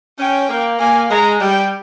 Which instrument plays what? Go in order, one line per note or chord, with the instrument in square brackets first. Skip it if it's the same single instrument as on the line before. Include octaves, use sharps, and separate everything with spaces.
[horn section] C#4 [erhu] G5
[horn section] A#3
[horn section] A#3 [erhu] G#5
[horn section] G#3 [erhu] A#5
[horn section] G3 [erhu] G5